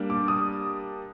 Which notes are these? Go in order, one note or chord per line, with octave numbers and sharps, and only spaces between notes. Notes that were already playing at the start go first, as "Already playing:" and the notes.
Already playing: G3 A#3 D4
D6
D#6